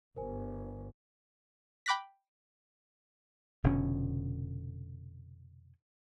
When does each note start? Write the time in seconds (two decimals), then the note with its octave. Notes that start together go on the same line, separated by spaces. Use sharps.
0.16 G1 A#4 C5 G#5
1.86 G5 B5 D6 F#6 A#6 B6
3.64 F1 B2 D3 C#4